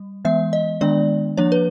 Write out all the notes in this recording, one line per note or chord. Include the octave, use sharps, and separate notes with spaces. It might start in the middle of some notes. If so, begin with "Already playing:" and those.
Already playing: G3
E3 G#3 B3 E5
D#5
D#3 G#3 B3 D4 D5
F3 A#3 D4 C#5
B4